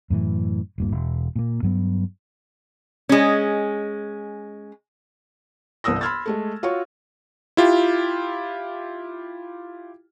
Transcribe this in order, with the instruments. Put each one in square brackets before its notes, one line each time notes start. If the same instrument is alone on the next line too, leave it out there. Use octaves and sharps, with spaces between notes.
[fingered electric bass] F#2 A2 D3 E3
D#1 G2 A#2
E1
A#2 A#3
G2 F#3 B3
[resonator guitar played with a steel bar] G#3 C#4
[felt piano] G1 C2 E3 D#6 E6 A#6
B5 C6 E6 F6 G#6 A6
G#3 A3 A4
F4 F#4 C#5 C#6
[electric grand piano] E4 F4 G4